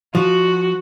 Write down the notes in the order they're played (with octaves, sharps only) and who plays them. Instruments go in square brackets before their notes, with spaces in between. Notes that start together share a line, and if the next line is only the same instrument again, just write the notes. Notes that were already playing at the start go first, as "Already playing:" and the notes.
[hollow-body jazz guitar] F3 [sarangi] F#4